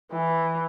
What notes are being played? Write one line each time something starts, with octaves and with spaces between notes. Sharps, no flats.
E3